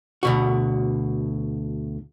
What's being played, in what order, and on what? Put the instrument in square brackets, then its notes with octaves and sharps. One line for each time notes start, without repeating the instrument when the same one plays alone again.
[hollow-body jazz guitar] D2 B2 F#4